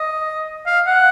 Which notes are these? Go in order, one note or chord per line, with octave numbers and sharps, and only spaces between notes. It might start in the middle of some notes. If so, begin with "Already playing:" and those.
Already playing: D#5
F5
F#5